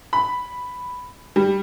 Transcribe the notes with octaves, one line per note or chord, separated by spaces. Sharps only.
B5
G3